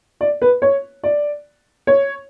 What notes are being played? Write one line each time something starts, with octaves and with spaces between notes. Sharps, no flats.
D5
B4
C#5
D5
C#5